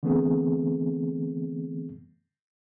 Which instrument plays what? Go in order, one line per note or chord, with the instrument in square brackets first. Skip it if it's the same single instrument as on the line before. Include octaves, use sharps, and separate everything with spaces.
[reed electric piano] D3 E3 A3 B3 C4 G#4